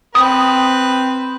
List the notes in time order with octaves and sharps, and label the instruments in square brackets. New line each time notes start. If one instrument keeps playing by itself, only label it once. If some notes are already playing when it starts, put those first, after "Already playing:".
[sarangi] C4 [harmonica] B4 [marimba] D#6